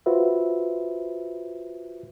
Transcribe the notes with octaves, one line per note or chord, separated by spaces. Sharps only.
F4 F#4 B4 C5 E5